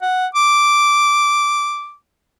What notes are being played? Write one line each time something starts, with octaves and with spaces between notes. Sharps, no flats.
F#5
D6